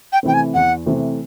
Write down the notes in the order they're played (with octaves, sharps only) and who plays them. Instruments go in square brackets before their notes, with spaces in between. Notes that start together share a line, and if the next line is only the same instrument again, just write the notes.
[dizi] G5
[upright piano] C3 E3 A3 C4 [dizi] G5
[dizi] G#5
[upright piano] E2 [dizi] F#5
[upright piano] C3 E3 A3 C4